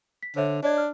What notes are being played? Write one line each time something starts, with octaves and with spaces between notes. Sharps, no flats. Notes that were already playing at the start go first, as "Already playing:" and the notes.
B6
D3 C5 C#5 E5
D4 C#5 D#5 G#6
F6